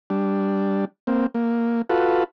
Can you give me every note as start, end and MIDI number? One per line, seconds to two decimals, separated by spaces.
0.10 0.85 55
0.10 0.85 62
1.07 1.26 58
1.07 1.26 60
1.34 1.82 58
1.89 2.24 65
1.89 2.24 66
1.89 2.24 69
1.89 2.24 71